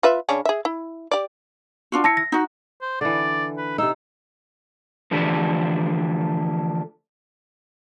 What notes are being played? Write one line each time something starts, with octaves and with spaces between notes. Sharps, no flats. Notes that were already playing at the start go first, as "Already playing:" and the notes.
F4 B4 E5
C#3 C#4 D4
G#4 E5
E4
G4 D5
D4 F4 F#4
E4 A5 A#6 C#7
A#6
D#4 F#4
C5
D3 E3 D5
B4
C3 D#4 E6
D3 E3 F3 A3 D4 G4